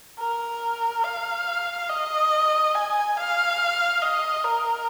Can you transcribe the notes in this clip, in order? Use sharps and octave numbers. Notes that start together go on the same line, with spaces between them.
A#4
F5
D#5
G#5
F5
D#5
A#4